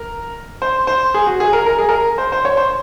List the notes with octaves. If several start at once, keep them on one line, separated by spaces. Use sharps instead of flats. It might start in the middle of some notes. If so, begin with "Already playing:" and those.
Already playing: A#4
C5
C5
G#4
F#4
G#4
A#4
A#4
G#4
A#4
C5
C5
C#5
C5